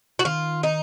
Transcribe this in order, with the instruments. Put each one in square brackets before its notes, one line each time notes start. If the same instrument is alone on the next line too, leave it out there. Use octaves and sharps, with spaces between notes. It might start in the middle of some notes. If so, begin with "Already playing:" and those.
[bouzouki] F#4
[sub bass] D#3 [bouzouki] F4
[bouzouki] D#4